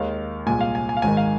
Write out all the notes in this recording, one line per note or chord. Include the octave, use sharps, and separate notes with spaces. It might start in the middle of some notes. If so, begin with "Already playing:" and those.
Already playing: D#2 D#3 G#3 F5
C2 A#2 G#3 G#5
F5
G#5
G#5
F5
G#1 G#2 D#3 G#5
F5